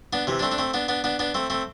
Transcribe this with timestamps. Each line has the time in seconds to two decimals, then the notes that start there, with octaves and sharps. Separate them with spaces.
0.13 B3 D4
0.27 C3 E3
0.39 D4
0.43 A3 C4
0.52 D4
0.58 A3 C4
0.74 B3 D4
0.88 B3 D4
1.04 B3 D4
1.19 B3 D4
1.34 A3 C4
1.50 A3 C4